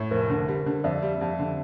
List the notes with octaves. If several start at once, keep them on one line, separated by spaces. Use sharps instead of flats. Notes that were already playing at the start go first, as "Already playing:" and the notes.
Already playing: A2
F1 A#4 C5
D3
G3
D3
F2 D5 E5
G3
F2
D3